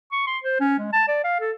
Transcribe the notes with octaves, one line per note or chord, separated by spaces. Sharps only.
C#6
C6
C5
C#4
G#3
A5
D5
F5
A4